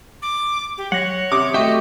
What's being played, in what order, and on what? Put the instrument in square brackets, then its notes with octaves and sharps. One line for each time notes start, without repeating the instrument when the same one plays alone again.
[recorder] D6
G4
[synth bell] F#3 A#6 [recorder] C#5 [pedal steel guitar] F#5
[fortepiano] C3 D6 [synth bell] D#6 C#7
[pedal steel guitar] A3 F#4 G4 [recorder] D#5 [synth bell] E5 G5 C#6